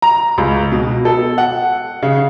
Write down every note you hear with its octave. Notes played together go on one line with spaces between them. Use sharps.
A#5
C#2
B2
A4
F#5
C#3